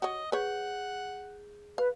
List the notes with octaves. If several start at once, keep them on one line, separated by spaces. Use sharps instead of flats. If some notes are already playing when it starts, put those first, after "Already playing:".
F#4 C#5 D#5
G#4 B4 C#5 F#5 G6
B4 F5